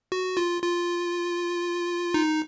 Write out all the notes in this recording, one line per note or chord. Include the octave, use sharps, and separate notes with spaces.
F#4
F4
F4
D#4